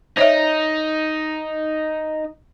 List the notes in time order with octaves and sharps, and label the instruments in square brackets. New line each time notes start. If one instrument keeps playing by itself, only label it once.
[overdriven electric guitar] D#4 [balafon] C5 C#5 E5